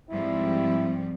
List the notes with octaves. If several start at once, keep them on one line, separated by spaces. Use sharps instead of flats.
G#2 F3 G3 C4 E4